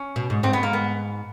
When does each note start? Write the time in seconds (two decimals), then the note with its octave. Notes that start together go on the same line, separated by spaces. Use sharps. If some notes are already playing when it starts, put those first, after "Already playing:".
Already playing: C#4
0.16 B2
0.30 G#2
0.43 G#2 C4
0.53 B3
0.63 A#3
0.73 B3